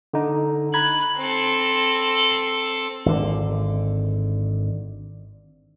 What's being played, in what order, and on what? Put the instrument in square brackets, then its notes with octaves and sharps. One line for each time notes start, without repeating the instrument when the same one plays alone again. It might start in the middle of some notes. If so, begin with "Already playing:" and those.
[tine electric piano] D3 D#4
[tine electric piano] A#5 B5 G#6 [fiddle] F#6
[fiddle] C4 A4
[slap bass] G#1 D3